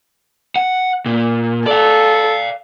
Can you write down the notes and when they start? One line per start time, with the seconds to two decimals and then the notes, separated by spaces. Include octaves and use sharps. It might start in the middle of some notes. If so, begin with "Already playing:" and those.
0.56 F#5
1.06 A#2
1.66 A4 D5 F5